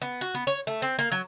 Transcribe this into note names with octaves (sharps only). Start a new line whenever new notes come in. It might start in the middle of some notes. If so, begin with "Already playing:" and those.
B3
F#4
B3
C#5
A3
C4
A#3
F#3